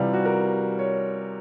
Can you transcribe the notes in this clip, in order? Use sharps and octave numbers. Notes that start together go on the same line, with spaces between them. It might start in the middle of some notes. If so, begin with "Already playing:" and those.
Already playing: C3 E3 G3 F4
F#4
A#4
C#5